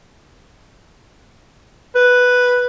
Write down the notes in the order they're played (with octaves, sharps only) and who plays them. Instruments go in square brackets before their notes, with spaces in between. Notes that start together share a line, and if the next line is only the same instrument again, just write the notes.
[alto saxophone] B4